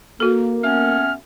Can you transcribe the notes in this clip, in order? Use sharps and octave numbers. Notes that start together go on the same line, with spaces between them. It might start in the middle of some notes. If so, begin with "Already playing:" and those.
A#3 F#4 A4
A3 B3 C#4 F6